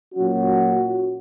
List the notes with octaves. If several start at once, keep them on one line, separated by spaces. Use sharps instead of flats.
A#2 F#3 C#4 F#4